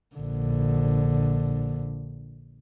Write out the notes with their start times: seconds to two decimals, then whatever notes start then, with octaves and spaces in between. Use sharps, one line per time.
0.16 A#1 D3